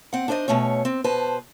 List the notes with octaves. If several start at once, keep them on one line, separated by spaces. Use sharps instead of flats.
C4 F#5
D4 D#4 C5 D5 D#5
B2 A3 C#4 C#5
C4
B2 B4 C5 A5